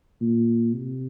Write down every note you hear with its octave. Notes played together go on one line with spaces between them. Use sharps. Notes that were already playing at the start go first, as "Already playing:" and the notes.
A#2
C3